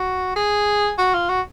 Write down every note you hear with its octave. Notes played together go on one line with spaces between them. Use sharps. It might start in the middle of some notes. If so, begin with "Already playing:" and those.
Already playing: F#4
G#4
F#4
F4
F#4